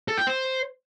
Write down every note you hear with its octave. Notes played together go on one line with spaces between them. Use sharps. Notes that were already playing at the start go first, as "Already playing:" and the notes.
A4
G5
C5